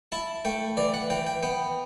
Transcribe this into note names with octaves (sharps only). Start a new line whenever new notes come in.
E4 A5
A3 G5
E3 D5
F#5
E3 G5
G5
B3 G5